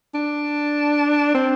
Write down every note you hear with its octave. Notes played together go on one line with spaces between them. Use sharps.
D4
C4